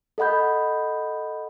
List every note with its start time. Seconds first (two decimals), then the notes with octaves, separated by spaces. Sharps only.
0.18 A4 D#5 F#5 B5 G6